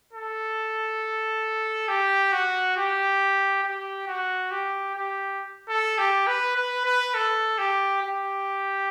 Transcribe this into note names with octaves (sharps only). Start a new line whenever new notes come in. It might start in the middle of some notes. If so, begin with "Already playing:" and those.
A4
G4
F#4
G4
G4
F#4
G4
G4
A4
G4
B4
B4
B4
A4
G4
G4